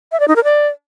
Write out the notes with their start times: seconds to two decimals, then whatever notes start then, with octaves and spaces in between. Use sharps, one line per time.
0.12 E5
0.20 D5
0.28 D#4
0.36 A#4
0.44 D5